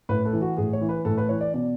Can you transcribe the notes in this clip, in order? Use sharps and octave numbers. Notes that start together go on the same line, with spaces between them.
A2 B4
A4
E3
F#4
A2 G#4
C#5
E3
B4
A2 A4
B4
E3 C#5
D5
B2 D5